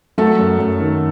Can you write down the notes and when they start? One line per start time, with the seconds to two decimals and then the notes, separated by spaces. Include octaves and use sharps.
0.18 F#3 A3 A4
0.39 F#2
0.59 F#2
0.80 D#3